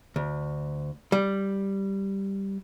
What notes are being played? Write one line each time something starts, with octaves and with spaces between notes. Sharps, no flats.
D2
G3